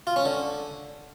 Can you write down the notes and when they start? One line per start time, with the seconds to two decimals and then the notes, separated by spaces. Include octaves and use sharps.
0.07 F4
0.16 C#4
0.25 D3